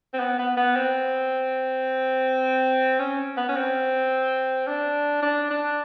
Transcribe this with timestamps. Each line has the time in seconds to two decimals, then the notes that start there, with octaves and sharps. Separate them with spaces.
0.13 C4
0.19 B3
0.38 B3
0.57 B3
0.76 C4
2.99 C#4
3.37 B3
3.49 C#4
3.56 C4
4.67 D4
5.22 D4
5.51 D4